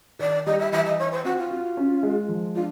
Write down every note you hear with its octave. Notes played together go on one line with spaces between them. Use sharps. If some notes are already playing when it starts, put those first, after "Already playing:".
D#3 D5
G3 D#5
E5
E3 E5
D#5
D#4 C#5
C5
C4 F#4
F4
F#4
C#4
G#3
F3
D4 F4